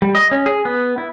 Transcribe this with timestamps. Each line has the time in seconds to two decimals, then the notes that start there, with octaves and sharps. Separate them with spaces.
0.02 G3
0.15 D#5
0.31 C#4
0.46 G#4
0.65 B3
0.98 E4